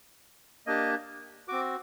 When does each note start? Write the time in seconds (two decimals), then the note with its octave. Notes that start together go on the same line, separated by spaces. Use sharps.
0.67 A#3 D4 G4 D#5
1.48 C4 F#4 D6